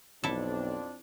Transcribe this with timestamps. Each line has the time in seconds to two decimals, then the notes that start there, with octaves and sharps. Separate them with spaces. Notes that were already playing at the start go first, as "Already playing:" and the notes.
0.24 B1 F2 C4 D4 E4 A4